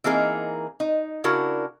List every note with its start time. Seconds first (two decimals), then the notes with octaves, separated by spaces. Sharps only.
0.04 E3 A#3 C4 D#4 G#4 A#4
0.80 D#4
1.24 C#3 D4 E4 F#4 A#4